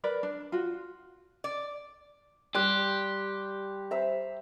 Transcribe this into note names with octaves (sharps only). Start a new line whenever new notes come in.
A#4 B4 D5 B5
D4
F4 F#4
D5
G3 G4 D5 C6 F#6
C5 E5 A#5